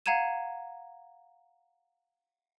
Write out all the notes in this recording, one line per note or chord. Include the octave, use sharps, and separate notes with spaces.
F5 F#5 A#5 G#6 D#7 E7